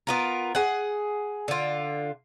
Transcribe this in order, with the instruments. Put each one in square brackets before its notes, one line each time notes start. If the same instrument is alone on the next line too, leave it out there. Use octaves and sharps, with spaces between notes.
[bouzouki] B3 F4 A#4
G#4 F#5
D3 F4